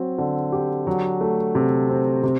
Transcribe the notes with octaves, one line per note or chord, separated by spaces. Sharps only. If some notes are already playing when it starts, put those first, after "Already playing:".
Already playing: F#3 C4
D3
G4
F#3
A3
C3
C4
C3